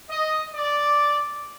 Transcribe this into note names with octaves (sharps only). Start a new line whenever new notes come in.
D#5
D5